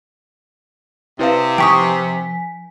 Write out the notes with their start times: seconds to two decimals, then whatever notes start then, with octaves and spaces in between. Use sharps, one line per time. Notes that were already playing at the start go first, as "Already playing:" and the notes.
1.19 C3 E4 B4 F5
1.58 F3 G5 G#5 C#6 D#6 B6